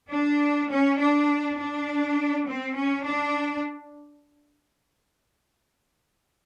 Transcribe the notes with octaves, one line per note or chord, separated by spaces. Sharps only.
D4
C#4
D4
D4
C4
C#4
D4